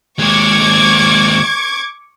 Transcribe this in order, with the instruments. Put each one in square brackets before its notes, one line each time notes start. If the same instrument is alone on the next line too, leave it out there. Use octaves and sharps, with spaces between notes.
[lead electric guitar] D#2 G#3 [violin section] C#6 D6 G#6